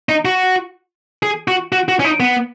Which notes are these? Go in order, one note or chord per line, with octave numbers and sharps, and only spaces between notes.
D#4
F#4
G#4
F#4
F#4
F#4
C#4
D#4
B3